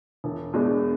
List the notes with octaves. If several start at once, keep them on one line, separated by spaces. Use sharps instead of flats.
E1
E2 B2 G#3 D4